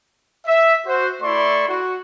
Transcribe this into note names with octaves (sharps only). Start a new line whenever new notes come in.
E5
F#4 C5
A3 E4 D5 C6 C#6
F#4